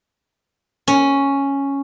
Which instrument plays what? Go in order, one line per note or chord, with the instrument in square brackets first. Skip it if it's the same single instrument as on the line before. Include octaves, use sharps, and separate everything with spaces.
[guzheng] C#4